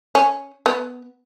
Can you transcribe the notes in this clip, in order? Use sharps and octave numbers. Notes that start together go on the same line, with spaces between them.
C#4
B3